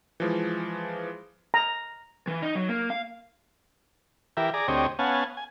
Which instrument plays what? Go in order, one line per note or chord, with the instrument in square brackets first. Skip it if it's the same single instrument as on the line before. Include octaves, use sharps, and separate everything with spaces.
[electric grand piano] E3 F3 G#3
[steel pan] A#5
[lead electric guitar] E3
D#4
F#3
A#3
F5
[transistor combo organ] E3 G4 A#4 E5
G#4 D5 A#5
D2 C4 G4 C#5 D#5
B3 C#4 F5 F#5 G#5 A5
G#5